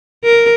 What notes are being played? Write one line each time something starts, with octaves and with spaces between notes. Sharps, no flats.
A#4